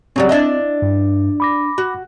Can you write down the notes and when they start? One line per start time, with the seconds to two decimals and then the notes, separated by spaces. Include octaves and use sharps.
0.16 C#3 F#3 G3 C4
0.29 D4 E4 D#5
0.82 G2
1.40 B5 D6 A#6
1.78 F#4